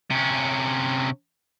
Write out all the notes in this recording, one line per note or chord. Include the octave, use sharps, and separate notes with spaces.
C3 C#4